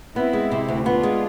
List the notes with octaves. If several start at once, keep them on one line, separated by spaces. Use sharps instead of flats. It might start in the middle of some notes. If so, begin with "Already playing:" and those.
B3 C4 E4
G#3
C3
D2
B3 D4 F4
G#3